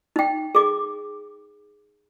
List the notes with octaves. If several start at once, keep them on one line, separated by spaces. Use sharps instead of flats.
D#4 G5
G#4 D6